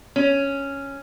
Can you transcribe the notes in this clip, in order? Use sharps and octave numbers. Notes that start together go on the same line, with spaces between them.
C#4